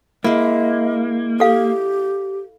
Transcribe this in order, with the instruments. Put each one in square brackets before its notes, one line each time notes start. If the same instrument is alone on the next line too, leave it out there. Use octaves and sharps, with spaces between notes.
[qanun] G#3 E4 [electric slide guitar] A#3 [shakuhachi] D#5
[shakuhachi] G4 [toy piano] A4 F5